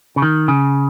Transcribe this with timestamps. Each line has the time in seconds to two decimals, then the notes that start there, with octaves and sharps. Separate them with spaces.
0.16 C#3
0.22 D#3
0.48 C#3